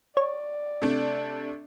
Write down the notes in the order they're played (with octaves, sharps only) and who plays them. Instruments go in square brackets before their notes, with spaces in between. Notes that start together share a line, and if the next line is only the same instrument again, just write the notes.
[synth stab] C#5 [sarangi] D5
[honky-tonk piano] C3 A3 D4